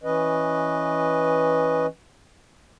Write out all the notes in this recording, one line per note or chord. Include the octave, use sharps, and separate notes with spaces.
E3 C#4 B4 D#5